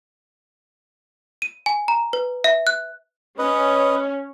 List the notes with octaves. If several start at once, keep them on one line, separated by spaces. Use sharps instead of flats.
D#7
G#5
A#5
B4
E5
F#6
C#4 B4 D#5